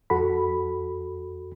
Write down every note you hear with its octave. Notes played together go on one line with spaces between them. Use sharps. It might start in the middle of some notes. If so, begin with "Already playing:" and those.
F2 F#4 A4 B5